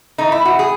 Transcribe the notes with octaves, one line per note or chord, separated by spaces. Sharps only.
A2 E3 A3 D#4
E4
F#4
G#4